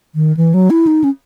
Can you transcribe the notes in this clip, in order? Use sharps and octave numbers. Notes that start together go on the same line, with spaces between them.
D#3
E3
F#3
E4
D#4
C#4